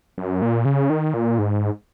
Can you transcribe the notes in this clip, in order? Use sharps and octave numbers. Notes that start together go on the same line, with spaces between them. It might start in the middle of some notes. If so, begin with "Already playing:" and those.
F#2
A#2
C#3
D#3
A#2
G#2